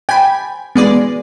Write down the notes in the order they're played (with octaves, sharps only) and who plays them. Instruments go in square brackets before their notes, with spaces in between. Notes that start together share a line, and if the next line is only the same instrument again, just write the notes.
[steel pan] G5 [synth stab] G#5 B5
[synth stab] G#3 G#4 D5 [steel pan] B3